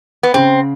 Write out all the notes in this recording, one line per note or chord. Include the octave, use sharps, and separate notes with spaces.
B3
C#3 C4